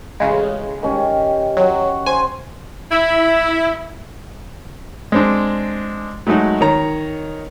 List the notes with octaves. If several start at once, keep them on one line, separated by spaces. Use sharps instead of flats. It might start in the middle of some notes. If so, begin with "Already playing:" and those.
A1 C#3 G#3
D#3 C#4 G4
F#3 F#5 C#6
C5 G#5
E4
G#3 C4 D4
F#3 G#3 A3 D#4 F#4
D#3 C#5 A#5